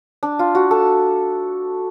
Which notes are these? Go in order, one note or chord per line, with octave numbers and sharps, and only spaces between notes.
D4
F4
F#4
A4